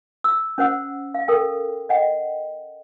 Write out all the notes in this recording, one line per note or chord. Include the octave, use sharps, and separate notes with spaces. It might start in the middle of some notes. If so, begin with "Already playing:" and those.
E6
C#4 C5 F#5 E6
F5
A4 A#4 G5
D#5 F#5 G5